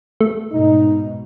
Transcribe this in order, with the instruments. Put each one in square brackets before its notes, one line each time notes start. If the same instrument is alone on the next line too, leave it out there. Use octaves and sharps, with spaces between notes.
[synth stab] A3
[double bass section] G#2 B2 [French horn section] D#4